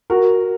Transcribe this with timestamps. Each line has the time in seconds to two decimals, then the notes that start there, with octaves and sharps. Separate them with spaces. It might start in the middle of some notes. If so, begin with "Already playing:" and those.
0.10 F#4 A#4